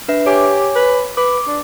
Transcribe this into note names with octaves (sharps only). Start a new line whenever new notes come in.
D4 B4 E5
G4 C#5 G#5 D6
B4
B4 D6
D4